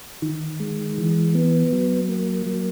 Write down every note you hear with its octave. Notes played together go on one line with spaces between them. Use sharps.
D#3
G#3
E3
B3
F#3
A#3
F#3